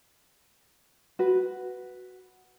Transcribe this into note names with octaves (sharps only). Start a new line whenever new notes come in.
F#4 B4